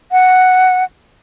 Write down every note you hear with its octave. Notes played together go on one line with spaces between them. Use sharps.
F#5